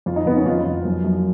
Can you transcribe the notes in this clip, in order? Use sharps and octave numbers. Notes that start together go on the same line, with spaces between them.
F2 F4
D#4
F2 B3
C#4
F2 F4
F2
F#2
F#2